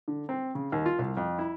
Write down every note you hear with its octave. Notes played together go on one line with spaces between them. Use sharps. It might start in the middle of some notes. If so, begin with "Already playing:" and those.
D3
C4
C#3
D#2
F4
C2
F2
E4